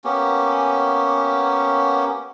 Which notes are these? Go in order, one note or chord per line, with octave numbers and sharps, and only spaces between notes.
A#3 B3 C#4 G4